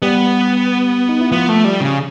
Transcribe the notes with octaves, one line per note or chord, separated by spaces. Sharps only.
G3 B3 G4
D#4
E4
F3 B3 F4
A3
G3
C#3